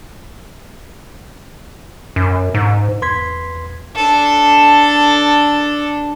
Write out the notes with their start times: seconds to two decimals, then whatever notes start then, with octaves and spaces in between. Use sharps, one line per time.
2.16 F#2
2.54 G#2
3.02 E2 B4 C6 G#6 B6
3.96 D4 A4